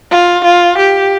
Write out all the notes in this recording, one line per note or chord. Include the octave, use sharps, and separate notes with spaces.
F4
F4
G4